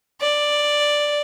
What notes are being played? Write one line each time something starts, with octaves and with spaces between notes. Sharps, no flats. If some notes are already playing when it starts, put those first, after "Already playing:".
D5